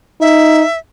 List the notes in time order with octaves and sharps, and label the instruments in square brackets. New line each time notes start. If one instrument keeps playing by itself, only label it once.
[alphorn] D#4 [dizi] E5